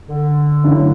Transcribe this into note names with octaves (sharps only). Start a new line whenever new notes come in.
D3
G1 G2 F#3 A3 E4